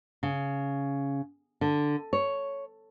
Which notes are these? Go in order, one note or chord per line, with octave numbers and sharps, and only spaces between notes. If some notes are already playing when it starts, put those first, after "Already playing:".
C#3
D3
C#5